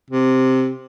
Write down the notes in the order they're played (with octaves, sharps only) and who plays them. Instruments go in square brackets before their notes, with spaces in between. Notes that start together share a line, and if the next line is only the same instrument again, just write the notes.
[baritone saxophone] C3